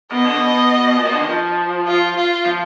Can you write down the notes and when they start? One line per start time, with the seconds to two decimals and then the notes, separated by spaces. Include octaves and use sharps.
0.12 B2 D#5
0.24 D3
0.36 B2
0.97 A#2
1.05 B2
1.12 D3
1.20 D#3
1.28 F3
1.87 F4
2.16 F4
2.46 F3